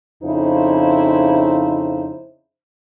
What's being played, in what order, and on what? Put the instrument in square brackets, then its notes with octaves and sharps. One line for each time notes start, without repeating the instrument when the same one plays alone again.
[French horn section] F2 C#3 D#4 E4 C5